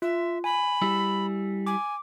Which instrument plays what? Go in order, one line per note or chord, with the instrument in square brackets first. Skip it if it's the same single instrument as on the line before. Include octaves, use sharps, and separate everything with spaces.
[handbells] F4 [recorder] E5
[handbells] G#5 [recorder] B5
[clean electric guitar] G3 E4 G#4 [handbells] E6
[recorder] G#5 [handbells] D6